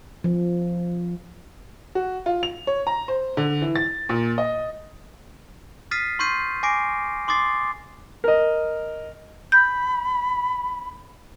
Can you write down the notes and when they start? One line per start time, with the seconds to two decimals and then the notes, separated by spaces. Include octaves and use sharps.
0.24 F3
1.95 F#4
2.26 F4
2.43 F7
2.67 C#5
2.87 A#5
3.08 C5
3.37 D3
3.62 E3
3.76 A6
4.09 A#2
4.38 D#5
5.91 D#6 F6 A6 B6 C7 D#7
6.19 C6 C#6 F6 G6 C7 D#7
6.63 G#5 D6 A#6 C7 D7
7.28 C6 D6 D#6 A6 C7
8.24 A#4 D#5
9.52 B5 G6